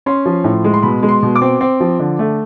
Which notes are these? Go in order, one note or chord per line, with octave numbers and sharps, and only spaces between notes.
C#4 C6
F3
A2
G#3
C6
B2 B5
G#3
C6
B2
D6
C4
C4
F3
D3
A3